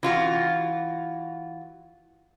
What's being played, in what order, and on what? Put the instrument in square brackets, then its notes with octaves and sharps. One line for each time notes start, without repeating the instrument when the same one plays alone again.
[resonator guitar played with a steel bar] E3 F4 F#4